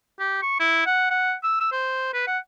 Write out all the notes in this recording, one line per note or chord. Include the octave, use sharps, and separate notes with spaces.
G4
C#6
E4
F#5
F#5
E6
E6
C5
B4
F#5